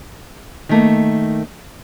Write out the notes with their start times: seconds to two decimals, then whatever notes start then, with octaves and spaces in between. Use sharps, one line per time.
0.69 D#3 A3 A#3